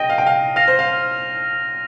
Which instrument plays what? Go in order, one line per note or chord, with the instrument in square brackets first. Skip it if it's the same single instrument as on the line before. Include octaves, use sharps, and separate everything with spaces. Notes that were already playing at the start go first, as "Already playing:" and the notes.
Already playing: [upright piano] D#5 G5 [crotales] A#6 D#7 G7
[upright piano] F5
G5
F5
[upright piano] F5 [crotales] F6 A#6 F7
[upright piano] C5
F5